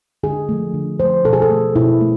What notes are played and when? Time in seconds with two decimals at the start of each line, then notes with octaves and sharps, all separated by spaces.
0.23 D3 G#4
0.49 F3 A3
0.74 D3
1.00 F3 A3 C5
1.24 B2 A4
1.33 G#4
1.42 A4
1.50 A3
1.75 B2 E4
2.01 A3